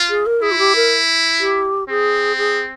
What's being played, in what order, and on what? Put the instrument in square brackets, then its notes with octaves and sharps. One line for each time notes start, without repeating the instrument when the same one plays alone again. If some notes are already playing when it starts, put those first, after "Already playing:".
Already playing: [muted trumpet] F4
[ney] G#4
A#4
[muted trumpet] E4 [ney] G#4
[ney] F4
G4
A#4
G4
[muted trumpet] C4 [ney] G#4
[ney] G#4